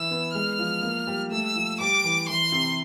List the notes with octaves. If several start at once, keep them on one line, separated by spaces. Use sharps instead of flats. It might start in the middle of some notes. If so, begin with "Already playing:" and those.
Already playing: E3 E4 E6
B3
G#3 F6
F3
A#3
G3
A3 E6
F3
G3 D6
E3
E3 C6
C3